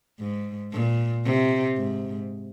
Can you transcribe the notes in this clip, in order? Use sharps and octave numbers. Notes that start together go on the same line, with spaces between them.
G#2
A#2
C3
G#2